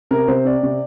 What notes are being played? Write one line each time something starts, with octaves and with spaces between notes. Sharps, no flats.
C3 A#4
C3 C5
C4 D5
C3